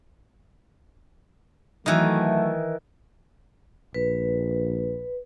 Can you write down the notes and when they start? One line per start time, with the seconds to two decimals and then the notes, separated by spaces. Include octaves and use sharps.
1.86 D#3 E3 F#3 A3
3.94 A#1 B4